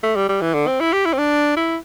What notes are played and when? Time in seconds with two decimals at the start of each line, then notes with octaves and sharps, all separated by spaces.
0.03 A3
0.16 G3
0.29 G3
0.41 E3
0.54 D3
0.67 C4
0.80 E4
0.93 G4
1.05 E4
1.13 C4
1.18 D4
1.57 E4